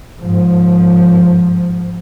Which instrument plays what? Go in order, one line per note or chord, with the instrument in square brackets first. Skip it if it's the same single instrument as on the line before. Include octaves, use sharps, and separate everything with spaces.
[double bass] G#2 F3